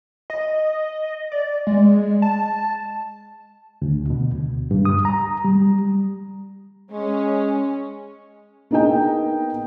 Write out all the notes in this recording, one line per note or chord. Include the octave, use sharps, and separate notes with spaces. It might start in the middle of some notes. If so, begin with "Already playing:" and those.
D#5
D5
G#3
A5
D2
B2
D2
G2
D#6
A#5
G3
G#3 C#4
A#3 B3 D#4 G#4 D#5 G5